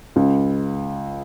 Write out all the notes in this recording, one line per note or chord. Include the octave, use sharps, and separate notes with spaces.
C#2